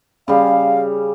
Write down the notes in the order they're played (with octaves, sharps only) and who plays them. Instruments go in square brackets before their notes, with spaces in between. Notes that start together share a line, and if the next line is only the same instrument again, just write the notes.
[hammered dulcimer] C#3 G3 [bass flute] F5